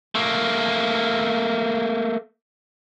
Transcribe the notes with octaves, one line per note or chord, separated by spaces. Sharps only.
A3 A#3